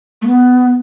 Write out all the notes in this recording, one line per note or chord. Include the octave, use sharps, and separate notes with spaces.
A3
B3